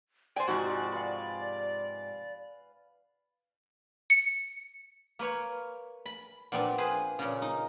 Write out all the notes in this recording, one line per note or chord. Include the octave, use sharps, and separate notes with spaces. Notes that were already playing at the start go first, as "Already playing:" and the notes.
C5 D5 G5 G#5
G#2 C3 F3 F#4
B4 F5
C#7
A#3 B4 C#5
B5
A#2 F3 B3 C4 D4
G#4 B4 C5
A#2 C#3
D#4